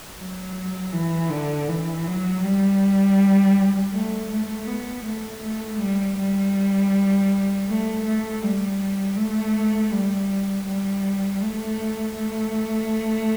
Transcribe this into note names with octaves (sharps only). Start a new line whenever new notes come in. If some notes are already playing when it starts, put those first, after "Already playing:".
F#3
E3
D3
E3
F#3
G3
A3
A3
B3
A3
A3
G3
G3
A3
A3
G3
A3
G3
G3
A3
A3